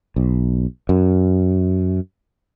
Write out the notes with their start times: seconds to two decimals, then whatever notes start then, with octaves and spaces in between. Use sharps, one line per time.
0.16 B1
0.89 F#2